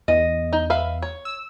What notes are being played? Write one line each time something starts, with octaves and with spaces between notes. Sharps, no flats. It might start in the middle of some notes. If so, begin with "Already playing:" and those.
E2 D#5
D#4
B4 E5 F5
C#5
E6